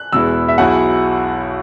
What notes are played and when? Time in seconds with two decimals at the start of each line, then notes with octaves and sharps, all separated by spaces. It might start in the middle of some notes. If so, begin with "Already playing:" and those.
Already playing: F#6
0.12 E2 B2 G#3 B3 E4 E6
0.48 E5
0.58 B1 B2 F#3 E4 G#4 F#5